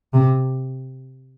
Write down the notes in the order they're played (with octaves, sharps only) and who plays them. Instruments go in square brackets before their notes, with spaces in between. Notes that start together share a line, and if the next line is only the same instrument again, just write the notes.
[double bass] C3